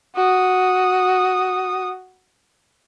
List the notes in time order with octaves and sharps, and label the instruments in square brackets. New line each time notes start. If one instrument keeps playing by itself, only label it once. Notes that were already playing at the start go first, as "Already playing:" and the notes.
[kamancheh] F#4 D#6